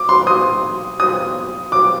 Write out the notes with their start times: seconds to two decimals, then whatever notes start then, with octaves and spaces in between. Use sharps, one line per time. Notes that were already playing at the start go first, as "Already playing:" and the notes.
Already playing: D6
0.09 C6
0.27 D#6
1.00 D#6
1.72 D6